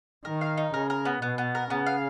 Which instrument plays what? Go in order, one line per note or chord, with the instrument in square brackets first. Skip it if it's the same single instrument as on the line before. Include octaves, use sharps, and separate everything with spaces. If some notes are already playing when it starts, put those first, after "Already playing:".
[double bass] D#3 [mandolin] A#4
[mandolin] F5
D#4
[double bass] C#3 [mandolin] A#4
[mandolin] A#4
B3
[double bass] B2 [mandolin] B3
[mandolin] B3
A#4
[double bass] C#3 [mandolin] B3
[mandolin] F5